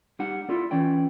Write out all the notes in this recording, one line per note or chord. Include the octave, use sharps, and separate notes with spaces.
G3 D#4 F#5
E4 F4 A4 D5
E3 C#4 D5 G5